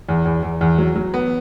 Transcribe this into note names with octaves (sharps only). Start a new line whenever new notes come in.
E2
E2
E2
E2
F#3
F#3
B3